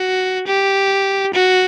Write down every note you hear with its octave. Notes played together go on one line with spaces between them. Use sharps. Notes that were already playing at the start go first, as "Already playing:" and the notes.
Already playing: F#4
G4
F#4